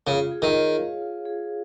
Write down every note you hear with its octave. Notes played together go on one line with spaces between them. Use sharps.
C#3 F4
G#4
D#3
C#5
F5
F4
G#4